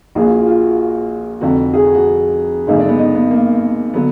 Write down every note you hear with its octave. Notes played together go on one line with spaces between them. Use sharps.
A#1 A#2 F3 G#4
F#4
F4
F4
F#4
F1 F2 D3 F#4
G#4
F#4
F#4
G#1 F#2 D3 G#3 D#4
D4
B3
D#4
B3
A#3
D3 F#3 B3